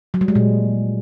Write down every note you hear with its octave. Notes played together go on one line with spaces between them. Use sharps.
F#3
G3
G#3
A#2